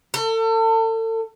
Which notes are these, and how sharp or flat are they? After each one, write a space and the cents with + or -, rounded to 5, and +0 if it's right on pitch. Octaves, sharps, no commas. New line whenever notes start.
A4 +35